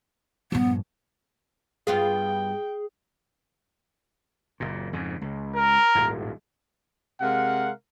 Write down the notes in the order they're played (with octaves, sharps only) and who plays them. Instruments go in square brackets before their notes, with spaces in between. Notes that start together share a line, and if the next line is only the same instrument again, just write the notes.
[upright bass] A#1 G2 [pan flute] B3
[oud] G2 B3 F4 [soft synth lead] G#4 [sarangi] G5
[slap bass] F#1 A#2
F2 G#2 C#3
C#2
[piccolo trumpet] A#4
[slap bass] D#1 G#1 A2
[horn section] C3 G#3 A#4 F5 F#5